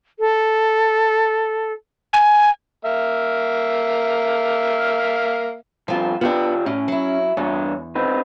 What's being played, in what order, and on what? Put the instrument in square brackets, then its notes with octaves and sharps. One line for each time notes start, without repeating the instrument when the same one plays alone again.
[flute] A4
[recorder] G#5
[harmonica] A#3 E5 F5
[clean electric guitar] G2 F4 [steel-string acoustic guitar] F3 C4
[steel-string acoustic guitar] B3 D4 [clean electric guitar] F4 G4 D5
[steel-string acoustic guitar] A2 [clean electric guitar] C#4
[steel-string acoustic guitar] F#3 E4
[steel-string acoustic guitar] E2 [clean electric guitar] G2 D4 C#5
[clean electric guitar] C4 D#4 B4